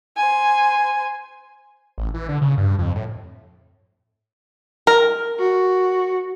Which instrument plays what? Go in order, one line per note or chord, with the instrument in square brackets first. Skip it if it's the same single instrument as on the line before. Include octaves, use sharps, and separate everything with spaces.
[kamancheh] C5 G#5
[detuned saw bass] A1
E3
D3
C#3
G2
F2
A2
[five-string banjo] A#4
[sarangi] F#4